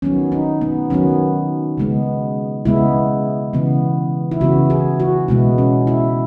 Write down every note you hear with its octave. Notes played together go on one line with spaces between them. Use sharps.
D#3 F#3 B3 C#4
D#4
B3
D#3 F#3 B3 C#4
C#3 G#3 B3
C#3 G#3 B3 E4
C#3 E3 B3
E4
C#3 E3 B3 F#4
G#4
F#4
B2 G#3 B3 E4
C#4
E4